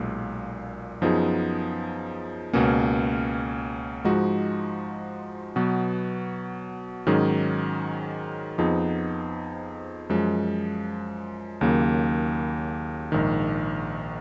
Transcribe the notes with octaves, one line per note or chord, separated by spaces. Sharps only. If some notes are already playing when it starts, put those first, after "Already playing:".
Already playing: B1 A#2 G#3
F#2 F3 B3 D#4 G#4
C#2 B2 A#3 C#4
G#2 F3 G#3 D#4 F#4
B2 F#3 B3 F#4
G#2 D#3 F#3 C#4 G#4
F2 F3 B3 D#4 G#4
F#2 F3 G#3
D#2 C#3 F#3 A#3
A#1 G#2 D#3